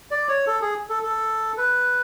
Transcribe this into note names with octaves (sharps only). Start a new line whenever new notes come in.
D5
C#5
A4
G#4
A4
A4
B4